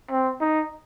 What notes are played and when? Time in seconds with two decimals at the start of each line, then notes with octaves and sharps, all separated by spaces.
0.11 C4
0.41 D#4